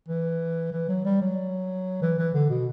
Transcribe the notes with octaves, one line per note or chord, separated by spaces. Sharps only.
E3
E3
F#3
G3
F#3
E3
E3
D3
B2